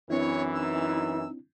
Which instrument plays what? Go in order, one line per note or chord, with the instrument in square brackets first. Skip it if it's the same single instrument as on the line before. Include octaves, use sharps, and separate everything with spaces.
[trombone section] F#2 E3 [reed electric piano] C4 D4 E4 [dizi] C#5
[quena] D#4 [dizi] E6